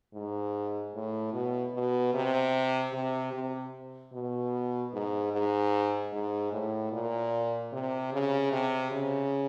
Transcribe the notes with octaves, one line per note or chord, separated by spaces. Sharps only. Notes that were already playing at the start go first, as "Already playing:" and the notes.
G#2
A2
B2
B2
C3
C3
C3
B2
G#2
G#2
G#2
A2
A#2
C3
C#3
C3
C#3